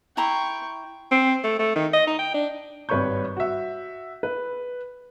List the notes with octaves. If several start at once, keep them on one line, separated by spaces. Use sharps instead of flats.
E4 G5 A#5 C6 C#6
C4
A3
A3
D#3
D#5
D#4
G5
D4
G#1 G2 B4 C#5 C#6 G6
F#4 E5
B4